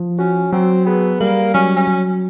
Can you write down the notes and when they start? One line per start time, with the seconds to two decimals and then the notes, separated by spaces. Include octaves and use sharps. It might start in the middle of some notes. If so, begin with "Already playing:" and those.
Already playing: F3
0.19 C#4 F#4
0.52 F#3 C4
0.86 B3 G#4
1.20 G3 A#3
1.54 F#3 C#4
1.76 C#4
1.87 F#3